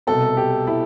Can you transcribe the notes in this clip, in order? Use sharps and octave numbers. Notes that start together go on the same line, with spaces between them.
C2 B2 A4
G4
E4